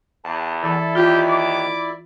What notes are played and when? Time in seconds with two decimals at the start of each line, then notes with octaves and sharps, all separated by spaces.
0.25 E2 A5
0.63 E3 E4 A4 D5 E5
0.95 D#2 F4 G4
1.29 D6